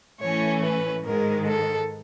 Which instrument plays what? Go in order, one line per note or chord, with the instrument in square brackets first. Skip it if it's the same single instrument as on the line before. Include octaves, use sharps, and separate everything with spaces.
[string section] A2 E3 A3 C#4 [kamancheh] C#5
[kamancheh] B4
[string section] G#2 D#3 G#3 [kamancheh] A#4
[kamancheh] A4